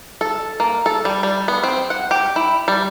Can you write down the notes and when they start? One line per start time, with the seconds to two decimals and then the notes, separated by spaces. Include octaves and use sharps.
0.21 A4
0.60 A#3
0.86 A4
1.05 G3
1.23 G3
1.48 B3
1.63 C4
1.90 F#5
2.11 G4
2.36 E4
2.68 G3